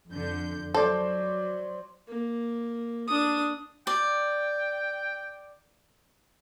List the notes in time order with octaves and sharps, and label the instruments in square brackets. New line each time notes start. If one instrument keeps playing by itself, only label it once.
[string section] F2 D3 G6
[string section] F#3 [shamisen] A4 [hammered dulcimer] C5 D5
[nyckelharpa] A#3
D4 D#6
[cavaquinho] D5 [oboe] G5